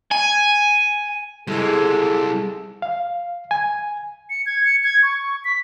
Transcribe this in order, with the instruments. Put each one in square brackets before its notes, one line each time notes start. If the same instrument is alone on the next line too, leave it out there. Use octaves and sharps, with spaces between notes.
[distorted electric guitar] G#5
[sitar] G#2 G#3 [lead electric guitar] G3 E4 [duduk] A4
[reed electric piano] F5
G#5
[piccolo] C#7
G#6
C#7
G#6
C#6
B6